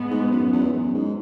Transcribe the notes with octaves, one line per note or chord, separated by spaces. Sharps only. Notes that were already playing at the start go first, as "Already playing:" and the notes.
Already playing: A2 G#3 B3
G#2
F#2
E2
F#2
G#2